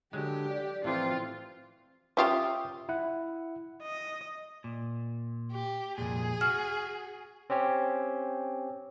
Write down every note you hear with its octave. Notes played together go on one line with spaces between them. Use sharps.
D3 F#3 G#3 G4
D5
A2 E3 F3 C4 F4
C#4 F4 G4 E5 G5 D#6
E4 F#5
D#5
A#2
G4
C2 F2 A#2 G#4
F#4 F6
C4 C#4 G4 C#5